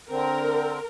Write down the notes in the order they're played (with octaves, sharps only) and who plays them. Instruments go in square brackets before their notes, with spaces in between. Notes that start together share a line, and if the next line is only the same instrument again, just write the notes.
[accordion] D3 C4 [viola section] A#4